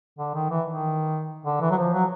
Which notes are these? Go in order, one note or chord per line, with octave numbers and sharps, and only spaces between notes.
D3
D#3
E3
D#3
D3
E3
F#3
F3
F#3